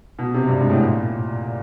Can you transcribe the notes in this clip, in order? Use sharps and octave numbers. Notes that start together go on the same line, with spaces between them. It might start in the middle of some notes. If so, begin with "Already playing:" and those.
B2
C3
G2
G#2
A2
A#2